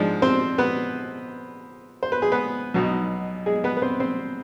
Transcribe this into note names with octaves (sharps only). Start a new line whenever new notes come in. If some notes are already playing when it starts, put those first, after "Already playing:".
Already playing: G#2 F3 G#3 D4 D5
C4 C5
B3 B4
C5
B4
G#4
B3 B4
B1 B2 B3 D#4
G#3 G#4
B3 B4
B4
C4 C5
C4 C5